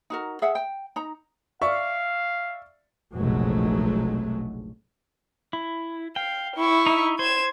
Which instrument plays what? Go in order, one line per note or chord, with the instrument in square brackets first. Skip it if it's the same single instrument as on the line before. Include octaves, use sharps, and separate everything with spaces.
[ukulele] D#4 F#4 A#4
G#4 E5 F#5
G5
D#4 A#5
[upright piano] D5 C#6 [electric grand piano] E5 [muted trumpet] F5
[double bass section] F1 A#1 B2 F#3 G#3 A3
[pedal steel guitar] E4
[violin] F5 [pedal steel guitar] G5
[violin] E4 C#6
[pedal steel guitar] D#4 E5
[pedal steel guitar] C5 [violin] G#6 E7